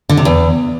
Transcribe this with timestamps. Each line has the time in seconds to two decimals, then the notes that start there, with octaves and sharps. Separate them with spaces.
0.09 D3
0.17 C3
0.25 E2